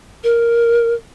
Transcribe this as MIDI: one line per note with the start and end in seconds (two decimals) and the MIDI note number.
0.24 0.94 70